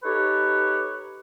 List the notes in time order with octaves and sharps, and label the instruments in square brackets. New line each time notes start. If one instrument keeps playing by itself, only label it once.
[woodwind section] D#4 G4 A4 B4 C#5